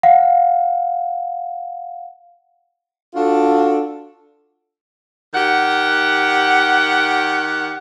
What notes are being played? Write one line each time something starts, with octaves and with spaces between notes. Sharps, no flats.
F5 F#5
D4 F4 F#4 A4
D#3 G4 F#5